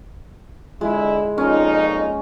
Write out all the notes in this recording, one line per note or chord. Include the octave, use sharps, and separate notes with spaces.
D3 G#3 E4
F2 A#2 C#4 D#4